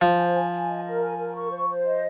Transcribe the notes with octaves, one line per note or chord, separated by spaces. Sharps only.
F3 C5
G#5
G#5
G#5
D#5
A#4
G#5
A#4
C#6
C5
C5
D#5